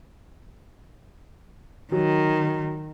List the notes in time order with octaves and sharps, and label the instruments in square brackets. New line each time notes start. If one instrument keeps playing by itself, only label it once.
[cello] D#3 [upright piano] F#3